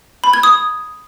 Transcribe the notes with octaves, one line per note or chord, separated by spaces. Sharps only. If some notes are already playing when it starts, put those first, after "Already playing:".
B5
G#6
D#6